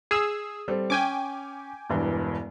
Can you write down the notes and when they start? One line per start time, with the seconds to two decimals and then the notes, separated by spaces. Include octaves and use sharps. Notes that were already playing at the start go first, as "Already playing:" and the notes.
0.11 G#4 D#6 E6 C7
0.68 G3 C4 A4
0.90 C#4 G5 G#5 D6
1.89 E1 G2 E3